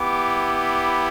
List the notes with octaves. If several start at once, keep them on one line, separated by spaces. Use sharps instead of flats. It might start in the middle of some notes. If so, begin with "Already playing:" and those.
Already playing: B3 E4 G4 D6
D6